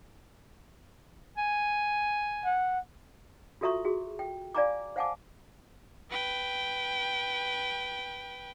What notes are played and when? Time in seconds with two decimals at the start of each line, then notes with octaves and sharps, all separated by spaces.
1.37 G#5
2.45 F#5
3.61 F4 F#4 A4 E5 A#5 C#6
3.85 F#4 G#4
4.19 G5
4.55 D5 F5 G#5 A#5 B5 D6
4.96 C5 F5 F#5 G#5 A5 D6
6.10 B4 G5